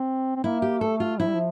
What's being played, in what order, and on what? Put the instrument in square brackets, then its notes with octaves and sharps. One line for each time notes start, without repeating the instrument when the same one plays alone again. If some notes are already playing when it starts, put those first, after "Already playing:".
Already playing: [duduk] C4
C4
[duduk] A#3 [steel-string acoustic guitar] E4
[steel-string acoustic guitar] G4
[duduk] A3 [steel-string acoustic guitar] A4
[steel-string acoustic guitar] F4
[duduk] F3 [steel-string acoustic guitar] E4
[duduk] G3
F3